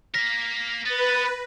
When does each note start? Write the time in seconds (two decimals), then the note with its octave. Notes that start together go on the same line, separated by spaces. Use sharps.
0.14 A#3 A#4 A#6 B6
0.85 B3 B4 A6